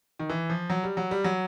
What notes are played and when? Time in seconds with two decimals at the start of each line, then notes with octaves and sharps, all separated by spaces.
0.19 D#3
0.29 E3
0.50 F3
0.70 F#3
0.84 G3
0.97 F#3
1.11 G3
1.24 F#3